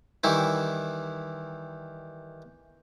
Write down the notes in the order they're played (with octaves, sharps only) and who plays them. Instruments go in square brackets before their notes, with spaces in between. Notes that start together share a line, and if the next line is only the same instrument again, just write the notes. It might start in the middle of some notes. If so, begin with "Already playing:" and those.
[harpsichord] D#3 E3 G3 E4